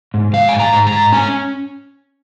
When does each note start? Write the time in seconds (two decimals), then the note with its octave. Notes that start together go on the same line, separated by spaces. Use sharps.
0.14 G#2
0.33 G#2 F5
0.49 G#2 G#5
0.59 A#5
0.73 G#2
0.87 A#5
0.92 G#2
1.12 C#4 G#5